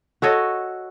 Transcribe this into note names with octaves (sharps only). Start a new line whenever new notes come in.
F#4 A4 C#5 D#5